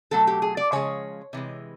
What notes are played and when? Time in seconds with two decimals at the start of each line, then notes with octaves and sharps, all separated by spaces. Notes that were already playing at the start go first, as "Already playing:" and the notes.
0.11 B2 F#3 A3 A4
0.27 G4
0.42 G#4
0.57 D5
0.72 C#3 F3 G#3 C#5
1.33 C3 E3 G#3